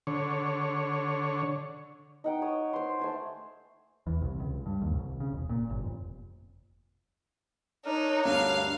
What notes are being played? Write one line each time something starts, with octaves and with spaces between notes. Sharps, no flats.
D3 C#5
D#4 F#5 G5
C#5 D#6
C5 C6
A3 C5 G#5
E2
C2
C#2
G2
D#2
C2
C#3
E1
A#2
G1
F1
D4 D#4 A#4 C#5
D2 G2 F5